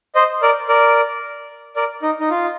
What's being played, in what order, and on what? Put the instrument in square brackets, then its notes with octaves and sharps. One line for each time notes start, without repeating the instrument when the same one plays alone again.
[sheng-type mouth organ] C5 D#5
A#4 D5
A#4 D5
A#4 D5
D#4
D#4
F4